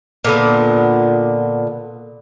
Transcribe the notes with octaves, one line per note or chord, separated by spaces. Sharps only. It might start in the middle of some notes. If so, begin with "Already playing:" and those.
A#2 D3 B3